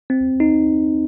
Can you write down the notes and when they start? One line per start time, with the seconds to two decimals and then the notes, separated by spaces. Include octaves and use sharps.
0.10 C4
0.40 D#4